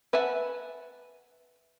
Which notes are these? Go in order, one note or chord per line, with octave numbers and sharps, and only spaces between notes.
B4 E5 F#5 G#5 A5